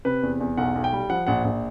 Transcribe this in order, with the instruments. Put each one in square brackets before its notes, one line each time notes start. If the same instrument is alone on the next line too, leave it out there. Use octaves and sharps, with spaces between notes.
[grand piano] C3 B4
E2
E2
B1 F#5
B1
G5
G3
F3 F#5
A#1 F#5
A#1